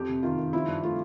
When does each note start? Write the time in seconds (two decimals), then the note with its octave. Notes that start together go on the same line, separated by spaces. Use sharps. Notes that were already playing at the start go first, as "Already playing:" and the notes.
Already playing: F2 G4
0.09 C3
0.23 D#3 F4
0.38 D#3
0.53 F3 E4
0.68 G2
0.83 A3 F4